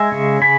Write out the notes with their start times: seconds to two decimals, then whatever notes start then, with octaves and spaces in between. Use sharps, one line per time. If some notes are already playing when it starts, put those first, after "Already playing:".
Already playing: G#3 E5 G#5
0.12 C#3
0.41 C#3 G#5 B5